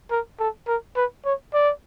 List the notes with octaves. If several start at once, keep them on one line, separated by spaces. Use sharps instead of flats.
A#4
A4
A#4
B4
C#5
D5